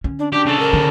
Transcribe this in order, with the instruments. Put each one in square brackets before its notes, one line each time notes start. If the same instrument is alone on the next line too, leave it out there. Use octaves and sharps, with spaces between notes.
[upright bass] D3 C#4
[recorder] D4
[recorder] D4 [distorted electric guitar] G4
[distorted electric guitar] C#3 A4
[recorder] A#4
[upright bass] D3